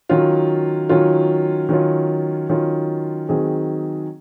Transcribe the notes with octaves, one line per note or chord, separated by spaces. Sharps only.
D#3 F#3 C#4 F4
D#3 F#3 C#4 F4
D#3 F#3 C#4 F4
D#3 F#3 C#4 F4
D#3 F#3 C4 D#4 G#4